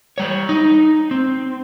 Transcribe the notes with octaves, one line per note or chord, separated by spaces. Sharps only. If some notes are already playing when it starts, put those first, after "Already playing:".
G3 C#5
D#4
C4